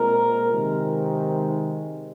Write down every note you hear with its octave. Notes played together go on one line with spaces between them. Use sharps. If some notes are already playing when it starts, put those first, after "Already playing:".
Already playing: A#2 G#3 C4 A#4
C3 D#3 G#3